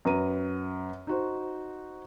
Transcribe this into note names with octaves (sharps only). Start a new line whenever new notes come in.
F#2 B4 A#5 D#7
D#4 F#4 C5